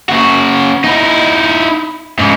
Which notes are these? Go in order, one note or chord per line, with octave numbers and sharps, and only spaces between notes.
C#3 F#4
D#4 E4
G#2 C#3